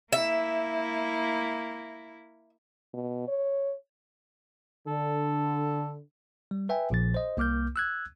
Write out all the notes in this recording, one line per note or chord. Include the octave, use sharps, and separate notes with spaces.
A#3 E4 E5
B2
C#5
D3 A4
G3
B4 E5 G5 G#5
A#1 A#2 F3 A6
C5 D#5
C2 A#3 D6 F6 G6
E6 F#6 G#6